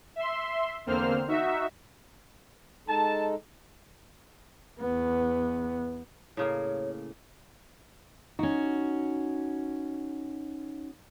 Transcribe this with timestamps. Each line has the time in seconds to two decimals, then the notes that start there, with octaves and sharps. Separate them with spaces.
0.16 E5 C6
0.86 E2 D3 A#3 C4 C5 F6
1.28 D#4 F#4 E5
2.88 G#3 D#4 A4 A5
4.80 E2 B3
6.37 A2 C#3 A#3 C#5
8.39 C#4 D#4 F#4